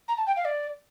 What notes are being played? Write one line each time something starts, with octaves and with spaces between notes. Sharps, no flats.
A#5
A5
G5
F5
D5